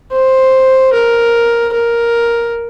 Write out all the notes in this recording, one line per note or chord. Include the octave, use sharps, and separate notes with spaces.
C5
A#4
A#4